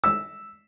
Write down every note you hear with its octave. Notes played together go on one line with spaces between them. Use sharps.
E6